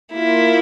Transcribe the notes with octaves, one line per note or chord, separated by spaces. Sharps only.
A#3 E4 F4 A#4